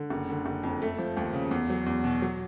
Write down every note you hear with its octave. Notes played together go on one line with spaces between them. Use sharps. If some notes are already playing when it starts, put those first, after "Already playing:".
Already playing: D3
F#1
D3
F#1
F2
A3
F3
D#2
C#3
E2
F#3
E2
B2
F#3